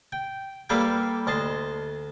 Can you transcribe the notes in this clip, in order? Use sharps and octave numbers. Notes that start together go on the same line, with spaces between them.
G5
G3 A#3 A4 B4 F5 G5
D2 D#5 A5 C6